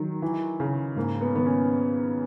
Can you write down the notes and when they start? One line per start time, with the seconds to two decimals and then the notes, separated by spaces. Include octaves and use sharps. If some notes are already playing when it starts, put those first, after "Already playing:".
Already playing: D#3 F#3
0.22 E3
0.60 C#3
0.96 G#2 A#3
1.21 B3
1.33 D#3 B3
1.46 C#4